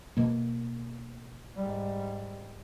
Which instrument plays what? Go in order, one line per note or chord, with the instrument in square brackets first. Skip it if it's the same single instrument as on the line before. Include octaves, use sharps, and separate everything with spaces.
[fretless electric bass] B2 A#3
[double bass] G#2 G3